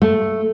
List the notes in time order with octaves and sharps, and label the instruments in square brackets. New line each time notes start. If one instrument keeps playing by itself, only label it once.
[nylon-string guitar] A3